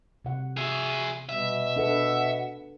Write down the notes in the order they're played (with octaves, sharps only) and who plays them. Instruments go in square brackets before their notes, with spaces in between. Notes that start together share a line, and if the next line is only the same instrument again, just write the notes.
[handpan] C3 F#5
[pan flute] F#4 [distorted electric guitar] G#4 E5
[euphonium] B2 [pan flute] G3 [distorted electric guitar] E5
[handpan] D4 A4 B4 [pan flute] F#5